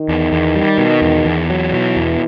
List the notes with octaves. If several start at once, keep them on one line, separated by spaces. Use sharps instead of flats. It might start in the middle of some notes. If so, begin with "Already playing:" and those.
Already playing: D#3
E2
E2
G3
B2
E2
E2
F#3
B2 E3
E2